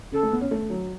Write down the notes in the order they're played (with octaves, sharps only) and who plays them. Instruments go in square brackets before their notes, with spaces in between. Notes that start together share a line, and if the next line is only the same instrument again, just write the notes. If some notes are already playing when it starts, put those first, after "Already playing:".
[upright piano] C#3 [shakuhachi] A4
[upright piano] A3
B3
C#4
A3
F#3